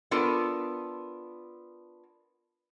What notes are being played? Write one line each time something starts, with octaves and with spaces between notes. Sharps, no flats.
B3 D4 F4 A4 A#4